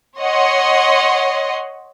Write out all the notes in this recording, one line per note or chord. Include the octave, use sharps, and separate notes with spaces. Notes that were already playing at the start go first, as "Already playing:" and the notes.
C#5 D#5 F#5 C6